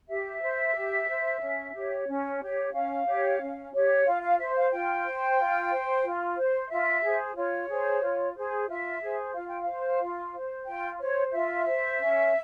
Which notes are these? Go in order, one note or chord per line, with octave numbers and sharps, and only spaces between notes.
G4 E5
C5
G4
C5
C#4
G4 C#5
C#4
G4 C#5
C#4 F5
G4 C#5
C#4
G4 C#5
F4 F5
F5
C5 E5
F5
F4 G5
C5
F4
C5
F4
C5
F4 E5
G#4 C5
F4 C#5
G#4 C5
F4
G#4 C5
F4 E5
G#4 C5
F4 F5
G5
F5
C5
F4
C5
F4 G5
C5 C#5
F4 E5
C5
C#4